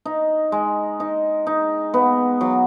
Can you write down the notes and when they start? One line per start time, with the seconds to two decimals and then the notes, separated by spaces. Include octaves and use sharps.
0.05 D#4
0.52 G#3
1.00 D#4
1.47 D#4
1.94 B3
2.41 F#3